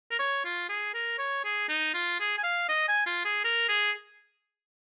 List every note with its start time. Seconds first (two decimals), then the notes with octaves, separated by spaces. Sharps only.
0.11 A#4
0.19 C#5
0.45 F4
0.69 G#4
0.94 A#4
1.18 C#5
1.44 G#4
1.69 D#4
1.94 F4
2.20 G#4
2.38 G#5
2.44 F5
2.69 D#5
2.88 G#5
3.06 F4
3.25 G#4
3.44 A#4
3.69 G#4